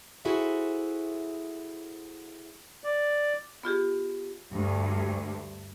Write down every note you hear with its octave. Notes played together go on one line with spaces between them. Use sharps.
E4 F#4 G#4 A4 C5 E5
D5
B3 F4 G4 G#4
D2 G2